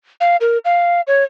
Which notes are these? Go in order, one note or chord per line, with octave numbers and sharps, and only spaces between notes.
F5
A#4
F5
C#5